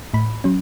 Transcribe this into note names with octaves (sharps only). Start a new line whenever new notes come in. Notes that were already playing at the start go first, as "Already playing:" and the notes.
A2 B5
F#3 C#4